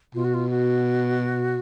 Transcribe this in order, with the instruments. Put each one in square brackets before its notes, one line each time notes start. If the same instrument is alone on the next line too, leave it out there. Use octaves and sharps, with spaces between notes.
[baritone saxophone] B2 [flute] F4
[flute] F#4
F4
F#4